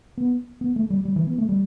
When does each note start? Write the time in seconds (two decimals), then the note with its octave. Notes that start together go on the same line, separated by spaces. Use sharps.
0.18 B3
0.61 B3
0.76 A3
0.90 G3
1.05 G3
1.16 E3
1.27 B3
1.38 A3
1.49 G3